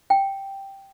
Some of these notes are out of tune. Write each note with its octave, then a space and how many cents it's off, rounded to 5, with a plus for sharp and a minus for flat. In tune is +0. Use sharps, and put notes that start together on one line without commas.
G5 +0